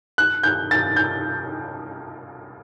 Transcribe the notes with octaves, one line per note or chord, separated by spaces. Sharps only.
F#6
G6
A6
G6